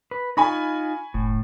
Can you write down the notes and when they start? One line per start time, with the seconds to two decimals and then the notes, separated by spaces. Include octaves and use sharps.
0.11 B4
0.37 D#4 F4 G#5 B5 C#6
1.14 F#1 A2